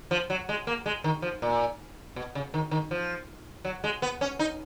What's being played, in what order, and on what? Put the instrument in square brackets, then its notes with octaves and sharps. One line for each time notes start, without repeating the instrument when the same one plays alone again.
[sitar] F3
F#3
G#3
A#3
G#3
D#3
F3
A#2
B2
C#3
D#3
D#3
F3
F#3
G#3
B3
C#4
D#4